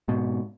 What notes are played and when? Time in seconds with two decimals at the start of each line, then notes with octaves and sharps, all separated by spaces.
0.08 G#2 B2